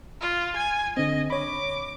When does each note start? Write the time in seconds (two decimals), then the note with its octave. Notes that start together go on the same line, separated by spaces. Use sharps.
0.21 F4
0.56 G#5 G#6
0.97 D3 C4 D#5
1.30 C#5 B5 D6